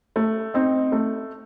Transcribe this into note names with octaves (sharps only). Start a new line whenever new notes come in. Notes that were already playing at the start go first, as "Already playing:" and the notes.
A3
C4 D#4
A3